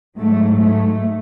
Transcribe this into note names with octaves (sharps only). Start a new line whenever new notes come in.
G#2 F#3 A3
A3